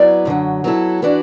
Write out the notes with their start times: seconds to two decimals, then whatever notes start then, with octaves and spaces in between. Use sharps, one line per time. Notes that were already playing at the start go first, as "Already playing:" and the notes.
Already playing: F#3 B3 E4 D5
0.25 F#2 D3 F#3
0.64 F#3 B3 E4 A4
1.02 E3 D4 F#4 B4 D5